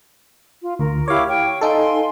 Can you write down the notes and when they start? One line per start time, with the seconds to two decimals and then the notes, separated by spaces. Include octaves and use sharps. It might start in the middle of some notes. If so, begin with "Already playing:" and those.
0.62 F4
0.79 D2 A#4
1.08 E4 G4 C#5 F5 D6
1.28 G5 C#6
1.61 D#4 A4 F5 G#5 C6